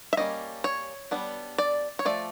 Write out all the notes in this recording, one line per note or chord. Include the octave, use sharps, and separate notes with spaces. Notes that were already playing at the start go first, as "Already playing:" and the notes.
E5
G3 A#3 C#4 D#5
C#5
G3 B3 D4
D5
C#5
F3 A3 D5